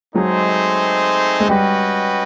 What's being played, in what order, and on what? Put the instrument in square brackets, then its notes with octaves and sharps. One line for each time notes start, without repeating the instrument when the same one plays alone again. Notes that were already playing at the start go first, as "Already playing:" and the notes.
[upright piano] F#3 G#3 [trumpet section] A3 C4 D#4 G#4 C5
[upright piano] G#3
[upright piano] G3 [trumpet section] C#4 F#4 B4 D#5 G5